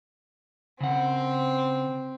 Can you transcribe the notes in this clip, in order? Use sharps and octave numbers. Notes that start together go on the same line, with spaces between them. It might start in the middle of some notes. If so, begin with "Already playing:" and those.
C#3 C4 F#5